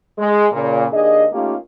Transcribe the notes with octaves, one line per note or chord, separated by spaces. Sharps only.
G#3
A#2 C#3
D#2 D4 G#4 D#5
A3 A#3 C#4 D#4 F4 G4